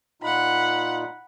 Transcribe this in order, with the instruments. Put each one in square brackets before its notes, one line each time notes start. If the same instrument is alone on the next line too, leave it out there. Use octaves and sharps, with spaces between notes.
[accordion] A#2 D#4 F4 [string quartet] F#5 B5